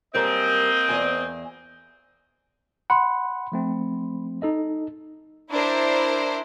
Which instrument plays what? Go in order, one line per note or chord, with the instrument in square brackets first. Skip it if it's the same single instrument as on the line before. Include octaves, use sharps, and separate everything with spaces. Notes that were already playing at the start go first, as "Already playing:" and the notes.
[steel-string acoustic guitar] F#2 G3 A#4 [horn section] A#3 C4 D#5
[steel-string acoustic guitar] E2 G#5
[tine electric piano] F#5 [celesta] B5 C6
[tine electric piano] F3 A3 C4
D#4 A4 D#5
[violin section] D4 E4 A#4 C5